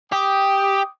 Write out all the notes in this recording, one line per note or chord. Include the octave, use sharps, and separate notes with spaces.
G4 G5 D6 D#6